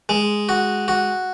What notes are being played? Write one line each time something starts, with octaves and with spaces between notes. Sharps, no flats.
G#3
F#4
F#4